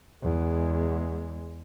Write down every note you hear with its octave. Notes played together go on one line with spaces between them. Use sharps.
E2 G#3